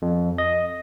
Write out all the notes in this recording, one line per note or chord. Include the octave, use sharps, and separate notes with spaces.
F2
D#5